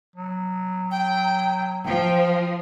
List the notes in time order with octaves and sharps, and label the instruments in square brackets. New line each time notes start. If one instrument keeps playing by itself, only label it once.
[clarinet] F#3
[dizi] G5
[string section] F3 [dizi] G5